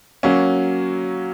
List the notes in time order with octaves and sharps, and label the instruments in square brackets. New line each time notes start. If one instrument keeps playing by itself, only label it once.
[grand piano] F#3 A#3 C#4